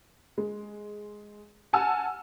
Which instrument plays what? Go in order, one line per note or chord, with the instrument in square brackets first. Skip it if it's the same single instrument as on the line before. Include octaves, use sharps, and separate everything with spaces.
[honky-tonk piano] G#3
F#5 G#5 A5 E6 F6